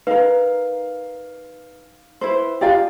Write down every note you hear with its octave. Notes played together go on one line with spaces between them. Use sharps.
D#4 A#4 B4 F5
E4 B4 C5
F4 G4 G#4 D5 F5 G5 A#5